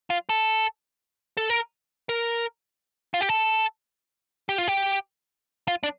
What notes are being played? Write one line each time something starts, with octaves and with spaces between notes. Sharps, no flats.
F4
A4
A4
A#4
A#4
F4
G4
A4
G4
F4
G4
F4
D4